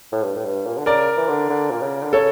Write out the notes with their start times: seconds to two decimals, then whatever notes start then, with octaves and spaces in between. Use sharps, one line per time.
0.12 A2
0.23 G2
0.36 A2
0.44 G2
0.66 A#2
0.77 D3
0.86 C#3 A#4 D5
1.17 E3
1.28 D3
1.50 D3
1.70 A#2
1.82 C#3
2.03 D3
2.13 C#3 A4 C#5